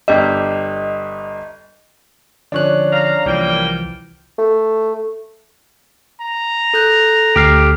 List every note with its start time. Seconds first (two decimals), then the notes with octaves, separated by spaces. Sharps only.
0.08 G1 D4 G4 D#5
2.52 D3 F3 C#4 D4 F#6
2.92 F5 A#5
3.26 C2 E3 F3 G3 A#3 G5
4.39 A3
6.21 A#5
6.74 A4 F#6 G6
7.36 D2 G4 F6 C7